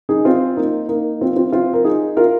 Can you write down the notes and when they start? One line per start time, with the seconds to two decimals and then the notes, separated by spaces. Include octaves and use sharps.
0.09 D#4 G#4
0.25 C4 F4
0.57 A#3 D#4
0.89 A#3 D#4
1.21 C4 F4
1.36 C4 F4
1.53 C4 F4
1.74 A#4
1.84 D#4 G#4
2.17 F4 A#4